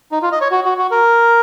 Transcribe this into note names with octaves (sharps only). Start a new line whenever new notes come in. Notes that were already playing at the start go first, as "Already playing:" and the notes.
D#4
F4
D#5
C#5
F#4
F#4
F#4
A#4